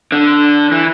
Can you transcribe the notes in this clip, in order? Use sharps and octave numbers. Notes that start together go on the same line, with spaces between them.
D3
E3